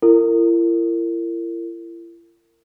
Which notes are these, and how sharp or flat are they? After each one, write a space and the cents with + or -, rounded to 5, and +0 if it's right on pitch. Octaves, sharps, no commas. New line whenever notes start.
E4 +40 A#4 -35